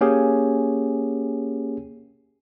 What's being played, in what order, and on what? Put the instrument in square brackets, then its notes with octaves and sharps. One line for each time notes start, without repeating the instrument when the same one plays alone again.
[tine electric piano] A#3 C#4 G4 G#4